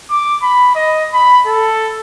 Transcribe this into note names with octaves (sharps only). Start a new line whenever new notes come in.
D6
B5
D#5
B5
A4